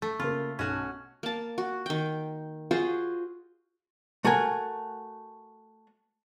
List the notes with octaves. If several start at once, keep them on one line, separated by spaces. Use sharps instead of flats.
A3
C#3 A#3 F4
B1 C#4 F#4
A#3 A5
F#4
D#3 G5
F4 F#4 G#4 C5
A3 F#4 A#4 G#5